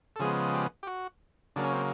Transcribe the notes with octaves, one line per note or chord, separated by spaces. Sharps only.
A4
C#3 F3 G#3 B3 G#4
G4
G4
F#4
C#3 F#3 A#3 D4
C#4
C4